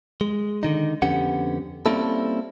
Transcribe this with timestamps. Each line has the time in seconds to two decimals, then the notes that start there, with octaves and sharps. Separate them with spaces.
0.21 G#3
0.63 D3 D#3 D#4
1.02 F2 D3 B3 C#4 G4 F#5
1.86 G3 A#3 C4 C#4 E4 A4